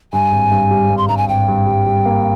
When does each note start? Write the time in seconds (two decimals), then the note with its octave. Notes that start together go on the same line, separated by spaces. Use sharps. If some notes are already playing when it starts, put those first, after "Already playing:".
0.13 G2 G#5
0.32 G#1
0.51 G2
0.71 G3
0.90 G2
0.97 C6
1.08 G2 A#5
1.17 G#5
1.28 G#1 G5
1.48 G2
1.67 G3
1.86 G3
2.06 A#3